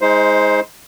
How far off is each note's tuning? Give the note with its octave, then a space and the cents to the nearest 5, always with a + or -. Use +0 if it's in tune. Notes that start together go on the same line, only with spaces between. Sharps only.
G#3 +0 D#4 +35 C5 +0